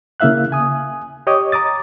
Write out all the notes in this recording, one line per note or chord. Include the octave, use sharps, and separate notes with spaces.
C#3 A#3 E4 E5 F5 F#6
G#5 D#6
G4 C#5 D#5 D6 D#6
A#5 D6 D#6 A6